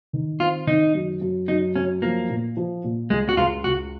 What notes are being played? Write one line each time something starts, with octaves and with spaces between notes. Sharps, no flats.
D#3
C4 F4
D#3 D#4
F#2
F#2
F#2 D#4
F#2 C#4
F3 A#3
A#2
F3
A#2
C#2 G#3
F#4
C#2 F4
C#2 F#4